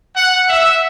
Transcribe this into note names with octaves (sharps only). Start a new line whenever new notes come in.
F#5
E5